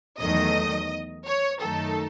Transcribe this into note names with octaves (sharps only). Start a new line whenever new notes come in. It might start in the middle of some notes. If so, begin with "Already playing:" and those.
E2 D#3 F#3 A3 D#5
C#5
F#2 D#3 A3 D#4 A4